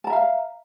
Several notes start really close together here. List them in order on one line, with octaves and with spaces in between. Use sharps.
A5 A#5 E5 F5